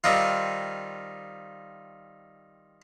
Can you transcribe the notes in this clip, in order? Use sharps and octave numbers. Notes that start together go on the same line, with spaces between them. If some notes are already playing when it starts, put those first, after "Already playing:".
D#3 G3 C4 D#4 F4